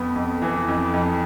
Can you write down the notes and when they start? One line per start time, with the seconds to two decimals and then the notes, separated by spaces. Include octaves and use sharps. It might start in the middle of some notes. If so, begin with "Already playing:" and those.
Already playing: F2 B3
0.16 F2
0.42 E3
0.68 F2
0.94 F2